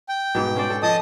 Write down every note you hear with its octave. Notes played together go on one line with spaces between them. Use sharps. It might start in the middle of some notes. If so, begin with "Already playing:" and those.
G5
G#2 B2
C#4 C5 D5
A4
F3 D#5 A5 D#6